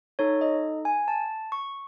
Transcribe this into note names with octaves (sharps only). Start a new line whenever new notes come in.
D#4 A4 C#5
D#5
G#5
A5
C#6